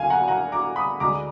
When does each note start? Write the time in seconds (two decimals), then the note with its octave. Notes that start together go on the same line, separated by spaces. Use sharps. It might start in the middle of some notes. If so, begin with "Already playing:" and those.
Already playing: D2 D3 F#3 F5 G#5
0.10 F#5 A#5
0.28 F#5 A#5
0.52 A#5 D6
0.76 B5 D#6
1.00 D2 D3 G#3 A#5 D6